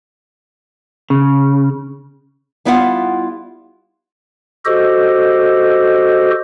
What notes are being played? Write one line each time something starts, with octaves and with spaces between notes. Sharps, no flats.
C#3
G3 B3 E4 F4 F5 F#5
F#4 G4 A4 C5 D#5